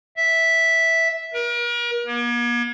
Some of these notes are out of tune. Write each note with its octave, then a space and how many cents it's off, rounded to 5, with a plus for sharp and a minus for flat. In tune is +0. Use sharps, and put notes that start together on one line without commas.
E5 -5
A#4 +40
A#3 +45